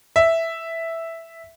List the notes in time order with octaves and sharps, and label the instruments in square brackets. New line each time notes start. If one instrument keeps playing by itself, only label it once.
[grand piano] E5